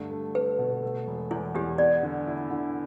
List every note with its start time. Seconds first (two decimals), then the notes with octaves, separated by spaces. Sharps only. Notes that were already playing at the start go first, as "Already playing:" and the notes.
Already playing: G2 D3 A3
0.10 A3
0.35 A3 B4
0.59 B2
0.83 A3
1.07 E1
1.31 E2 E4
1.55 E2 G4
1.78 B3 D5
2.03 D3
2.27 E4
2.51 D3